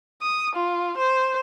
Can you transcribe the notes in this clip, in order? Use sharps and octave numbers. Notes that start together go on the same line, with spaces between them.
D#6
F4
C5